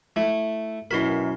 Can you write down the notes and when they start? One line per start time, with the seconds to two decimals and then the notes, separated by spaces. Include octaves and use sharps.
0.16 A3 E4
0.91 F#2 B2 E4 F#4 A#4 B5 C6